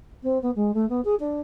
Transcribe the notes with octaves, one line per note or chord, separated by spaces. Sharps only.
C4
B3
G#3
A3
B3
G#4
D4